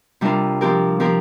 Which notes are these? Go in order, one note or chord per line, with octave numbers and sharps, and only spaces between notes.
C3 G3 D4 F4 A#4
F3 C4 G4 A#4
F3 C4 G4 A#4